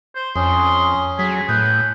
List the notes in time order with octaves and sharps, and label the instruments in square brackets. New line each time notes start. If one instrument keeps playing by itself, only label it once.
[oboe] C5
[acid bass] F2 [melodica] C#4 [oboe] C6 [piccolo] D#6
[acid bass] F#3 [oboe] G#4 [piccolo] B6
[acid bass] A2 [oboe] B4 [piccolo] G6